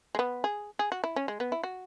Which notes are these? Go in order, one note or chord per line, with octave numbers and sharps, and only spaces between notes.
G#3
B3
G#4
G#4
F#4
E4
C#4
G#3
B3
E4
F#4